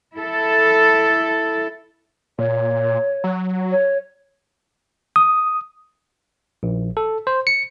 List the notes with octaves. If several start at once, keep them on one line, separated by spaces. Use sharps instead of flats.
E4 A4
A#2 C#5
F#3
C#5
D#6
A#1
A4
C5
C#7